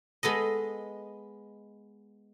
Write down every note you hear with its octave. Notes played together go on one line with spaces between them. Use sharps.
G#3 B3 A4 D#5